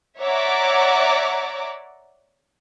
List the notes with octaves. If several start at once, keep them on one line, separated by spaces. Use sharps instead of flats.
C#5 D5 E5 F#5 A#5 D6